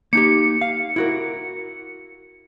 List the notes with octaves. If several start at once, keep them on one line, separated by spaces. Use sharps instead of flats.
A#3 D#4 G4 C#7
F5
E4 F#4 A#4